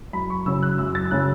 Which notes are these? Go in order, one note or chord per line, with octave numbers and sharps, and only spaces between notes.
F#2 B5
C#6
C#3 F#3 C#4 E6
F#6
F#2 E6
A6
E6
C#3 F#3 C#4 F#6